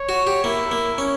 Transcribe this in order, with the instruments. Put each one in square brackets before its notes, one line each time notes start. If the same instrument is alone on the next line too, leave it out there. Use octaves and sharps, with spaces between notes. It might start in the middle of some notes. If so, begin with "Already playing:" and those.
Already playing: [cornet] C#5
[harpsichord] F#4
G4
[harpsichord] A#3 [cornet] E4
[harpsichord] A#3
C#4